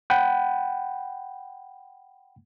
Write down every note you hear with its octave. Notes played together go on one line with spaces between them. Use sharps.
F#5 G5 B5